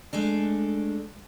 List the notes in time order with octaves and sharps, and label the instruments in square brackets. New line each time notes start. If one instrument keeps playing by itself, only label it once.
[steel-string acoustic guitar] G#3 A3 D4